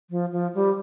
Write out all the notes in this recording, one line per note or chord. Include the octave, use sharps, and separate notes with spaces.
F3
F3
G3